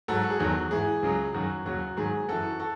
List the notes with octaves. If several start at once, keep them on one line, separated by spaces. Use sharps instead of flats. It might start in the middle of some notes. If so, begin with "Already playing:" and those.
G#2 F#3 F#4 A4
G#4
E2 D#3 F#3 F#4
G#2 E3 G#4
C#2 C#3 F#3
F#2 D#3 F#3 F#4
D#2 C#3 F#3 F#4
G#2 D#3 F#3 G#4
F#2 E3 F#4 A4
F#4 A4